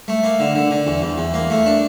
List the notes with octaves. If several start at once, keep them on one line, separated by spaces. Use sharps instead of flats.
A3
A#3
D3
D3
D3
E2
E2
E2
A#3
A3
D4